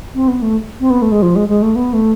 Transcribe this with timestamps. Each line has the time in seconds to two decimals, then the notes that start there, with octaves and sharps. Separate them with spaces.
0.15 C4
0.28 B3
0.42 A3
0.80 C4
0.90 B3
1.02 A3
1.12 G#3
1.22 F3
1.36 G#3
1.49 G#3
1.62 A3
1.76 B3
1.93 A3